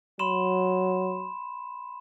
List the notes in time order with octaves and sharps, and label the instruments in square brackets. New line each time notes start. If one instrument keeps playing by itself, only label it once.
[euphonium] F#3 [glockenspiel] B5 C6 E7